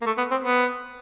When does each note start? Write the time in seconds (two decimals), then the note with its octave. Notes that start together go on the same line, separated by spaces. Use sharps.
0.02 A#3
0.06 A3
0.18 B3
0.31 C4
0.43 B3